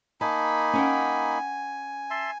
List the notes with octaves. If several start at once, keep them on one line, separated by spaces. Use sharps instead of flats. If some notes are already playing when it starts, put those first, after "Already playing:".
A#3 D#4 G#5 A5 B5
C#4 F#5 G5
E5 A5 C6